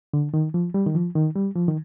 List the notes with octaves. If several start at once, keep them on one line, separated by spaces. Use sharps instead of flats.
D3
D#3
F3
G3
D#3
F3
D#3
G3
F3
D#3